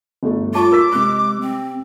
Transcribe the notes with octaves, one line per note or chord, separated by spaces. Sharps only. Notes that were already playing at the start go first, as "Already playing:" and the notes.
G1 A3 A4
F4 C#5 A5 C#6 D6
A#4 E6 B6
C3 G#3 F#6
C4